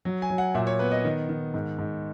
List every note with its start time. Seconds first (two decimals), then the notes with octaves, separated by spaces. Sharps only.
0.05 F#3
0.22 G#5
0.30 F#3
0.38 F#5
0.55 A#2 E5
0.67 C#5
0.79 B3 B4
0.92 D#5
1.04 D#3
1.29 D#3
1.54 G#2
1.78 G#2